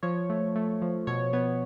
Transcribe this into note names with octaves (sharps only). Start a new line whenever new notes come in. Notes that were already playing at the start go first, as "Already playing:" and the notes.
F3 C#5
A3
A3
F3
B2 C#5
B3 C#5